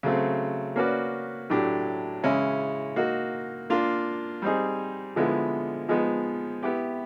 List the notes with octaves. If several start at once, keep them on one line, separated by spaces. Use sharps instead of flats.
C#3 F#3 A3 C4
A#3 C#4 F#4 B4 D5
A2 F#3 A3 D4 G4
C#3 E3 G#3 C#4 E4
A#3 D#4 F#4
A#3 D4 F4
G3 C4 D#4 G#4
D3 F3 G#3 B3 E4
F3 G#3 B3 D#4
B3 E4 G4